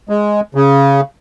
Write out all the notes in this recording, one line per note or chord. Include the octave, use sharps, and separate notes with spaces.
G#3
C#3